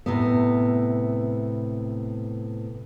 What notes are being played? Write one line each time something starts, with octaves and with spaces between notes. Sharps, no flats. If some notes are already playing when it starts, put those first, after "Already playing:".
A2 C3 B3